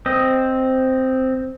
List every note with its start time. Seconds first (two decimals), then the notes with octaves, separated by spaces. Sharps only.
0.06 C4 D#5